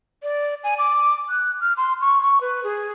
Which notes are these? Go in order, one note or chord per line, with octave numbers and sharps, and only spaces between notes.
D5
G#5
D6
F#6
F6
C6
C#6
C#6
B4
G#4